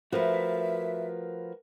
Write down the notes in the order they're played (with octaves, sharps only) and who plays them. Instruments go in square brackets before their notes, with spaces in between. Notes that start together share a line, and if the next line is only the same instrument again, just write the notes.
[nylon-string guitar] F3 A3 [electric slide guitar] F#4 A#4 B4 [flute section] E5